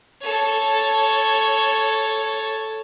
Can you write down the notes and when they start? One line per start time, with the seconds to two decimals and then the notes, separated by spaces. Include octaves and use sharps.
0.22 A4 C#5